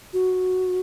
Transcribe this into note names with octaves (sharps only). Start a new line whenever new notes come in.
F#4